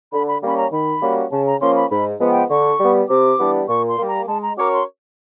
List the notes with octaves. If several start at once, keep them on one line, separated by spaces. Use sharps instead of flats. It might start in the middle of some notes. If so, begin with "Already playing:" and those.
D3 B5
B5
G3 A#3 C#4 B5
A#5
D#3 B5
G3 A#3 C#4 F#4
C#3 A5
A#5
F3 A#3 C#4 C6
B5
G#2 B5
F3 G#3 B3
G5
D3 C#6
G3 B3
C3 D6
E3 G3 B3 D4
A#2 C#6
C6
G3 A#3
A#5
G#3 A5
A#5
C#4 F#4 A#4 C#5 D6
C6